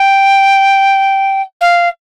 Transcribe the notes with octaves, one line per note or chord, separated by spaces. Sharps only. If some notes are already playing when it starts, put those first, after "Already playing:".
Already playing: G5
F5